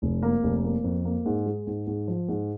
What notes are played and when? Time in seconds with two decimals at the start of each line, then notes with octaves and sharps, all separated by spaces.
0.02 F1
0.23 A#3
0.43 F1
0.64 A#3
0.84 F2
1.05 A#3
1.26 G#2
1.46 G#3
1.67 G#2
1.87 G#2
2.08 F3
2.28 G#2